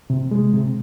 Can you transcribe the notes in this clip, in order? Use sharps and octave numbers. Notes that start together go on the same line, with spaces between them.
C3
G#3
C3